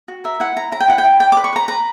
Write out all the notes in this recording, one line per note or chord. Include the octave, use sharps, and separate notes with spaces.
F#4
A#4 E5
E4 F#5
E4 A#5
E4 A#5
G5
E4 F#5
G5
E4
D5 G5
B4 D6
C#6
B4 A#5
B4 A#5